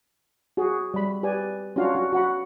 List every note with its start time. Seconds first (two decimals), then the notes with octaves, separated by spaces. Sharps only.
0.57 F#4 G#4
0.94 G3 B5
1.23 G4 B4 D5 G#5
1.76 C#4 D4 F4 F#4 F5
1.95 F#4
2.13 F#4 F#5 B5